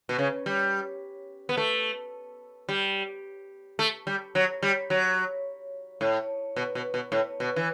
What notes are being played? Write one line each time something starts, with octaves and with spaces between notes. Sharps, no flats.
B2
C#3
G3
B3
A3
G3
A3
G3
F#3
G3
F#3
A2
B2
B2
B2
A2
B2
E3